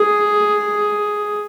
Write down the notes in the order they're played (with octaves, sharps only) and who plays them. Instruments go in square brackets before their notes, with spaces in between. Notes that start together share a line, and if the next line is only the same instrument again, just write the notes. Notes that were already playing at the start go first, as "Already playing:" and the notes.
Already playing: [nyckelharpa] G#4